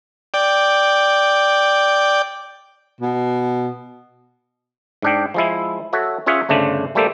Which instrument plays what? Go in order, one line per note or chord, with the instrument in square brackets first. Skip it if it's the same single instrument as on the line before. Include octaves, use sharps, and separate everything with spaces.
[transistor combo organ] D5 G5
[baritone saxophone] B2
[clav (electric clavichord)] G#2 D4 G5
F3 G#3 E4
F#4 A4 C#5 E5
C#4 F4 G#4 C#5 E5 F#5
G1 C#3 A3 D4 C5
G3 A3 A#3 G4 A4 C5